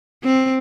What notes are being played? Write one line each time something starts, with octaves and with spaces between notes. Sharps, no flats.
C4